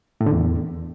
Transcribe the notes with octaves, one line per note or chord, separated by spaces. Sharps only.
A2
D3
E2